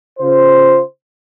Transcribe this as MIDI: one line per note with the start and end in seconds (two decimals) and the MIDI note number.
0.19 0.80 49
0.19 0.80 65
0.19 0.80 72